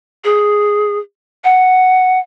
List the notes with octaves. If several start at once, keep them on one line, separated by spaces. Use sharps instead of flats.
G#4
F#5